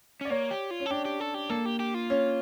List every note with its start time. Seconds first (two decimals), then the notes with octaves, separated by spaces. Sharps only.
0.21 C#4 D5
0.30 A#3 C#5
0.51 G4
0.71 F4
0.80 C#4
0.86 A4
0.91 D4 G4
1.05 G4
1.20 A4
1.34 G4
1.50 A#3 A4
1.65 G4
1.80 G4
1.94 F4
2.10 C#4